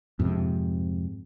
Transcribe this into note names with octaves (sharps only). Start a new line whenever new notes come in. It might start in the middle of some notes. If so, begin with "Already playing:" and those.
F2 G#2 C3